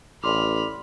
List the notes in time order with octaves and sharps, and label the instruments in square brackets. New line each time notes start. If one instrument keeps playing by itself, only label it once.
[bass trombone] A1 [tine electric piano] D5 C6 D6 [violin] B5 F6